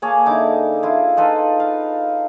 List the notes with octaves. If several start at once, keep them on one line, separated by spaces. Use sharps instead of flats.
A#3 G#4 C#5 A5
D3 D#4 E4 D6
E4 F4
D#4 F4 A4 B4
F5